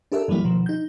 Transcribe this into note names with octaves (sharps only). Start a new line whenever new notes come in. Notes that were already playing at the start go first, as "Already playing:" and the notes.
D4 G4 A4 A#4 E5
G2 E3 F#3 G3 A#3 E4
B2 D#3 F3
D#4 G6